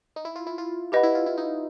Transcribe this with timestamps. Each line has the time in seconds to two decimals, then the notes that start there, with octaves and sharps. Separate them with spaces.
0.16 D#4
0.25 E4
0.36 F4
0.47 E4
0.58 F4
0.92 E4 G4 B4 D#5 F#5 B5
1.03 E4
1.15 F4
1.26 E4
1.37 D#4